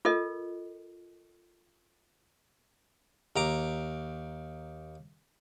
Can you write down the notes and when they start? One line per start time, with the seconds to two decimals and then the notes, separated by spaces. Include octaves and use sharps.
0.05 F4 A4 A#4 D#5
3.36 D#2 A#5 D6